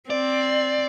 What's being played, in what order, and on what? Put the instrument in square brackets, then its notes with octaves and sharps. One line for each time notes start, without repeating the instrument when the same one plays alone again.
[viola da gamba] C4 [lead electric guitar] D5